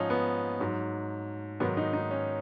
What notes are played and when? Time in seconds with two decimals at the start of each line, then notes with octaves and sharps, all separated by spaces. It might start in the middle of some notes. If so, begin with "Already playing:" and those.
Already playing: G#2 F3 C#4 D#4
0.10 B3
0.60 G#2 F#3
1.60 G#2 D#3 F#3 B3
1.77 D#4
1.93 D#4
2.11 C#4